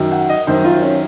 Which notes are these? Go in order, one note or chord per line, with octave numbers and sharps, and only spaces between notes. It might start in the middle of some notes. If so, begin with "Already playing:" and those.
Already playing: F#2 D#3 F#3
F#5
D#5
F#2 D#3 F#3 C5
F4
C#4